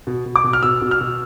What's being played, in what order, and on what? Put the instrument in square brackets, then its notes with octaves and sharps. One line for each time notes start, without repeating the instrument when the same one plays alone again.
[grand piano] B2
B2
D6
B2
F6
B2 E6
B2
F6
B2